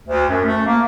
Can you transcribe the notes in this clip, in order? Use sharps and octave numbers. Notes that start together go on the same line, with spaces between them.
D2
F#2
A3
A#3